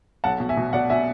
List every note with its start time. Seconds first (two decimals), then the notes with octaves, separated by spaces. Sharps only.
0.24 B1 F#5 A5
0.40 B2
0.49 E5 G#5
0.57 B2
0.73 B2 D5 F#5
0.90 B2 E5 G#5